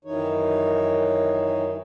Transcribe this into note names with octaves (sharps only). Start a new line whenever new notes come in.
F#2 D#3 E3 D#4 C#5